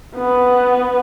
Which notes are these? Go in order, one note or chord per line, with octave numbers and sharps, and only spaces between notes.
B3